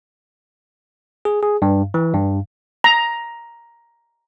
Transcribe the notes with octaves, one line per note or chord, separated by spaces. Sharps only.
G#4
G#4
G2
E3
G2
A#5